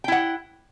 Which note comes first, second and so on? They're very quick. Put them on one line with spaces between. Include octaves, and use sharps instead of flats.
G5 E4 F#5